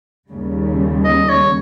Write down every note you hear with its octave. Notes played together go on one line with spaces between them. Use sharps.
D#2 C#3 G3
D#5
C#5